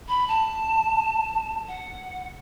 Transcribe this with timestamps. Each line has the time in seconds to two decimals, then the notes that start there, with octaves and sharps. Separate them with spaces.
0.08 B5
0.28 A5
1.68 F#5